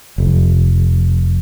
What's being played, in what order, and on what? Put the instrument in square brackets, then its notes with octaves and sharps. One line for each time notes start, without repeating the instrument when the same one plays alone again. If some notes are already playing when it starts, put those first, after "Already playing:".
[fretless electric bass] F1